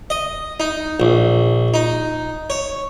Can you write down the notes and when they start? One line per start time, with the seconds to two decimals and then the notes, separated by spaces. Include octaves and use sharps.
0.10 D#5
0.60 D#4
1.00 A#1
1.74 D#4
2.50 C#5